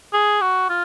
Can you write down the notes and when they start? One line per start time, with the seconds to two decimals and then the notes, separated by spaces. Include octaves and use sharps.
0.13 G#4
0.41 F#4
0.69 F4